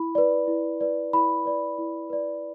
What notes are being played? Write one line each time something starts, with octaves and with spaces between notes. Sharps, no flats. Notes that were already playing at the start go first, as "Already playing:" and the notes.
Already playing: E4 B5
B4 D5
E4
B4 D5
E4 B5
B4 D5
E4
B4 D5